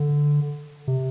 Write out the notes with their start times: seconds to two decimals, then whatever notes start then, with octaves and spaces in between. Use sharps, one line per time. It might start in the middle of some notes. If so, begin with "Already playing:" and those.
Already playing: D3
0.88 C3